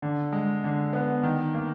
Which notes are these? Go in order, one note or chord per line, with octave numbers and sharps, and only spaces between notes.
D3
G#3
D3
B3
D#3
A#3